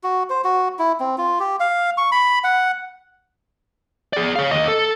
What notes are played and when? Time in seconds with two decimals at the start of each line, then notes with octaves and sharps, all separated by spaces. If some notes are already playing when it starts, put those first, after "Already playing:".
0.03 F#4
0.30 C5
0.44 F#4
0.79 E4
1.00 C4
1.18 F4
1.39 G4
1.60 F5
1.97 C#6
2.12 B5
2.44 F#5
4.13 G#4 D5
4.36 C#5 F5
4.51 D#2 D#5
4.68 A4